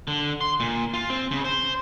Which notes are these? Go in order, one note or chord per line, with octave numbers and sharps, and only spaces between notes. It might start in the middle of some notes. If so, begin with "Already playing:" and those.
D3
C6
A#2
F4
C4
C#3
C5